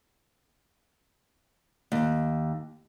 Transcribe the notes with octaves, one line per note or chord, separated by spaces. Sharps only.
D#2